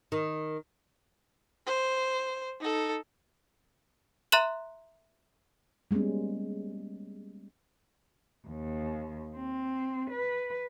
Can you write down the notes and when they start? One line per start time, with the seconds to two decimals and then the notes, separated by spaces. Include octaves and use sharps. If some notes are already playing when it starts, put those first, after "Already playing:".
0.12 D#3
1.67 C5
2.60 D#4 A4
4.32 E5 A#5 C6 F#6 E7 F#7
5.91 G3 G#3 A#3 B3 C#4
8.48 D#2
9.36 C4
10.11 B4